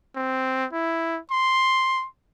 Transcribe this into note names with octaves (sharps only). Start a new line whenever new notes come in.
C4
E4
C6